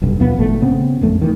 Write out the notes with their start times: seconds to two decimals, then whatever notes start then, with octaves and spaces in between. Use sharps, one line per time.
0.02 F1 B1 G2
0.19 D#2 B2 F3 B3
0.38 G#1 A#2 A3
0.62 C#3 B3 C4
1.01 A1 F2 A3
1.21 D#3 E3